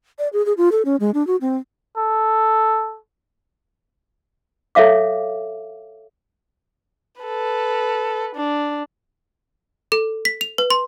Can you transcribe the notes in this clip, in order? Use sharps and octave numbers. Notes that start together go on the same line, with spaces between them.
D5
G#4
G#4
F4
A4
C#4
G#3
D4
F#4
C4
A4
A4 C#5 E5 F5 D6
A4 B4
D4
A4
B6
F7
B4
C6